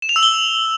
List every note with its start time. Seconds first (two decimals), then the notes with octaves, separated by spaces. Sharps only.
0.02 E7
0.09 F7
0.16 E6
0.23 G7